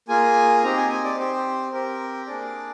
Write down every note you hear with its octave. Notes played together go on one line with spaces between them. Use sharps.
A#3 F4 G#4 G#5
C4 D#4 G4 A#5
G#5
G#5
D5
C4 G4 C5
C4 G4 A#4
A#3 D4 G#4 D5